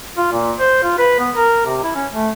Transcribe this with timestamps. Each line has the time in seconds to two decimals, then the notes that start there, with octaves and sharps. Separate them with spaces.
0.18 F4
0.32 A#2
0.59 C5
0.83 F4
0.98 B4
1.19 B3
1.36 A#4
1.66 C3
1.83 E4
1.95 C#4
2.13 A3